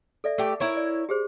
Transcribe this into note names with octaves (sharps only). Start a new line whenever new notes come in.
A4 D5 E5
A3 G4
E4 A#4 C#5
D5
G4 G#4 C5